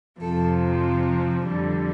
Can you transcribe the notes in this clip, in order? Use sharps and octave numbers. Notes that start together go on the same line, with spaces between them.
F2 C3 F3 A4
F2 D3 G3